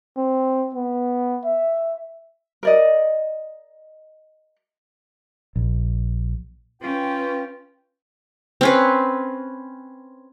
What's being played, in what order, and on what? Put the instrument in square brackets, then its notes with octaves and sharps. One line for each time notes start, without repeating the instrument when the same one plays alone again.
[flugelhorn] C4
B3
E5
[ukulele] A#4 D5 D#5
[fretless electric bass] A#1
[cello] C#4 [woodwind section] F4 G5 [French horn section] B4
[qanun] C4 C#4 B4